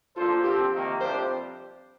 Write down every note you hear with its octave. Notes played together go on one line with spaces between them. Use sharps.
F3 A#3 D4 F4 A4 C5
D3 F3 C4 G4
C3 D#3 A#3
F2 C3 G3 D4 G4 C5